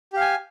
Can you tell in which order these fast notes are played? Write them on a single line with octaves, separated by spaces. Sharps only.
G4 F5 G#5